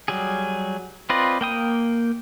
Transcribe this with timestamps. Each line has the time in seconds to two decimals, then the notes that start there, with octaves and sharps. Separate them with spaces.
0.08 F#3 G3 G#4
1.10 C4 F4 B4 D5 D#5
1.41 A#3 G5 D#6